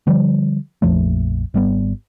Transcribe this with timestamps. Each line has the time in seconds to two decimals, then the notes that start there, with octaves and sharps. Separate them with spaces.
0.07 D3 F3 G3
0.82 A#1 F2 F3 A3
1.54 G#1 G3 B3